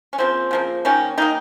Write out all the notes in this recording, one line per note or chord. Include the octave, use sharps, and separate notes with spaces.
C#4
C#3 F3 A#3 C4
C#3 F3 A#3
D#3 A#3 C#4
D#3 A#3 D#4